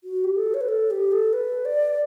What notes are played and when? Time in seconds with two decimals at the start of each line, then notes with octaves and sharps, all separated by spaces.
0.04 F#4
0.24 G4
0.36 A4
0.54 C#5
0.61 B4
0.68 A4
0.90 G4
1.12 A4
1.33 B4
1.65 D5